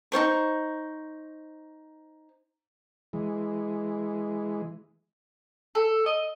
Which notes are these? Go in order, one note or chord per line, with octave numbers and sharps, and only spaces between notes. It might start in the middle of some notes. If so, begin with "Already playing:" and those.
D#4 F4 C5 C#6
E3 G#3
A4
D#5